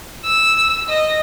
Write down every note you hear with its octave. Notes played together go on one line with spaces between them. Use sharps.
E6
D#5